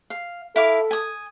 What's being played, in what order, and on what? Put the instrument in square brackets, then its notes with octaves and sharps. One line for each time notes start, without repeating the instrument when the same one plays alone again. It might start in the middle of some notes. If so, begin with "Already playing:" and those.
[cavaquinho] F5
[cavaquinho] E4 F5 D6 [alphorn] A4
[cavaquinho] G#5 D#6